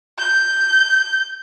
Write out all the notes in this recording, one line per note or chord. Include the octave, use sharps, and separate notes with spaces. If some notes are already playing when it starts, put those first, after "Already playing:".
G6